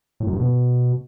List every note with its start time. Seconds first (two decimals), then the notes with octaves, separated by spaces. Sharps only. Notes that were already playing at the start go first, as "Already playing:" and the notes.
0.20 A2
0.27 F#2
0.33 G2
0.40 B2